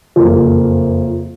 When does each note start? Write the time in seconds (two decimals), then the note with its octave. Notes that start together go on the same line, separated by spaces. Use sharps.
0.16 F#1 F2 F3 A#3